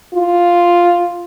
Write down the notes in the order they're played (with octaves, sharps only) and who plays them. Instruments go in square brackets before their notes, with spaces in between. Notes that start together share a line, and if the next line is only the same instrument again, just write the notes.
[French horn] F4